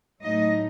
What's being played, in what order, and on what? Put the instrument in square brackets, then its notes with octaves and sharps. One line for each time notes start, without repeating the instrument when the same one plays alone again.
[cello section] A2 F#3 A3 D#4 D#5